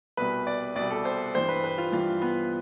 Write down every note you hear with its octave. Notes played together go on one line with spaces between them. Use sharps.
C2 B2 G3 B4
D5
C2 B2 G3 D5
A4
C5
G2 E3 G3 C5
B4
B4
F4
G2 E3 G3 F4
B3